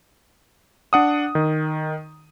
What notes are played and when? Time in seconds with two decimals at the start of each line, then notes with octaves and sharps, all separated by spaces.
0.93 D4 F#5 D#6
1.35 D#3